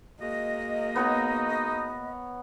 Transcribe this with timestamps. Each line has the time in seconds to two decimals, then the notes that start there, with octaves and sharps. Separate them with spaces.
0.20 G#3 A#3 F#4 D#5
0.96 B3 D#4 C#5 A#5